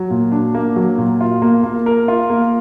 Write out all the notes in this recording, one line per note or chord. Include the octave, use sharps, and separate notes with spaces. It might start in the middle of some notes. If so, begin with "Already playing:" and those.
Already playing: F#3
A#2
D4
A#3
F#3
A#2
F4
A#3
A#3
A#4
F4
A#3